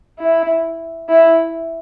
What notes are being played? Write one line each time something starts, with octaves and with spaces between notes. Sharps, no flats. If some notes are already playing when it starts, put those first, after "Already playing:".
E4
E4